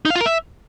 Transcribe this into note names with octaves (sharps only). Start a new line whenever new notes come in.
D#4
F5
F4
A#4
E5